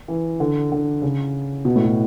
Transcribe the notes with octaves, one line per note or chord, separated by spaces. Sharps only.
E3
D3
D3
C#3
B2
A2
B2